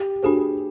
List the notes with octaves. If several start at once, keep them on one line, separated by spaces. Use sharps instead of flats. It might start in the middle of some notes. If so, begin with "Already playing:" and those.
Already playing: G4
D4 F#4 G#4 A4 C5